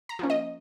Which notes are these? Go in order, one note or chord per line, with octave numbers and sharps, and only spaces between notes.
A#5
F3 A#3 C#4
D#5